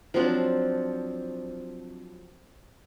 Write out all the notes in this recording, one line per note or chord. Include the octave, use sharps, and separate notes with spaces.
F3 F#3 C4 D4